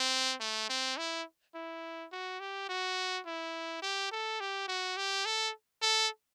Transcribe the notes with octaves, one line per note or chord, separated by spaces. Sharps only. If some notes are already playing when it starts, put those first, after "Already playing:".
Already playing: C4
A3
C4
E4
E4
F#4
G4
F#4
E4
G4
A4
G4
F#4
G4
A4
A4